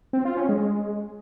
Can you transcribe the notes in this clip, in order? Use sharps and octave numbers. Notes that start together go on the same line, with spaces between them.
C4
F4
C#4
G#3